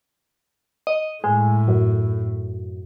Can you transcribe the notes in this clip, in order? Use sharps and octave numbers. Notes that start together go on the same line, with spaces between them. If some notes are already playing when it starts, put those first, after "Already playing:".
D#5
A2 G#3
F#2